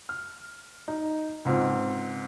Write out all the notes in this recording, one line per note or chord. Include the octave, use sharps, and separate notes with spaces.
F6
D#4
C#2 G#2 C4